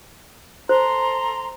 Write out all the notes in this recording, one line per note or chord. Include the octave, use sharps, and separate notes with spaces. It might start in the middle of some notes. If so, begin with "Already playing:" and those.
A4 C5 A#5 C6